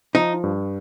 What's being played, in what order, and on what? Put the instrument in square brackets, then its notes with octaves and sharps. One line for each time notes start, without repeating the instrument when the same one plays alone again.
[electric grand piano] F3 [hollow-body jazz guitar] D#4
[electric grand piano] G2